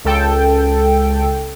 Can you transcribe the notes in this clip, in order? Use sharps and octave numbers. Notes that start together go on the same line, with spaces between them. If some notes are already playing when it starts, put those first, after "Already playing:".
C#2 A4 G5